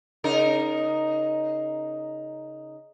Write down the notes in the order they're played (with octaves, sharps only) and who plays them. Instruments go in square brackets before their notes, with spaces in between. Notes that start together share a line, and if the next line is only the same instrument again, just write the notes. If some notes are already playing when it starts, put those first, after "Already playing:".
[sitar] C#3 D#4 A#4